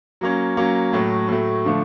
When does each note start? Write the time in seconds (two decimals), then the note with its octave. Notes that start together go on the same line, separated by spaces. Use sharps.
0.21 F#3 A#3 C#4
0.57 F#3 A#3 C#4
0.93 A2 F#3 A3
1.29 A2 F#3 A3
1.65 D3 F3 A3